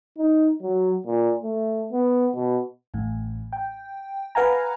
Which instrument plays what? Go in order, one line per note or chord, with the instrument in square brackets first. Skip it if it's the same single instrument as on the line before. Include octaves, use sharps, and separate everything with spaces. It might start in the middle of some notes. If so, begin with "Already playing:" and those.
[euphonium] D#4
F#3
A#2
A3
B3
B2
[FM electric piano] A1 A2
G5
B4 F5 F#5 G#5 A#5